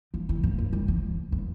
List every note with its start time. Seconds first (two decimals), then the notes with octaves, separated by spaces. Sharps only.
0.14 F3
0.29 E3
0.43 F3
0.58 F3
0.73 G3
0.88 F3
1.32 E3